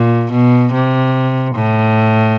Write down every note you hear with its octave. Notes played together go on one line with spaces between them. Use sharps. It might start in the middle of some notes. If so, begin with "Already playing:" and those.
Already playing: A#2
B2
C3
A2